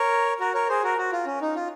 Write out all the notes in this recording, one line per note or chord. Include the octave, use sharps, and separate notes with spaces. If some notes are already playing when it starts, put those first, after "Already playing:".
Already playing: A#4 C#5
F#4 A#4
A#4 C#5
G#4 C5
F#4 A#4
F#4
F4
C#4
D#4
F4